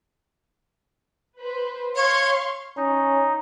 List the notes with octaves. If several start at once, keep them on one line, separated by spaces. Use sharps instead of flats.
B4 C5
C#5 F5 C6 C#6
C#4 D#4